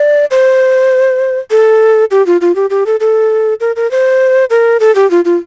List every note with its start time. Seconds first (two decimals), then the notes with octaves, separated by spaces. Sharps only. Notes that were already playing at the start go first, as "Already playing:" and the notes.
Already playing: D5
0.31 C5
1.51 A4
2.11 G4
2.26 F4
2.41 F4
2.56 G4
2.70 G4
2.86 A4
3.00 A4
3.60 A#4
3.76 A#4
3.91 C5
4.50 A#4
4.80 A4
4.95 G4
5.11 F4
5.25 F4